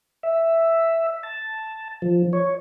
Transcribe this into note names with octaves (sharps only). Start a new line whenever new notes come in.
E5
A5
F3
C#5